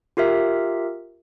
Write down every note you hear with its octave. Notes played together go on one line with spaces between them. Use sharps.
F4 G4 A#4 E5